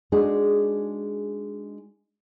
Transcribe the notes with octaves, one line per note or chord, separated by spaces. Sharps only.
G#3 D4 D#4 F#4 G#4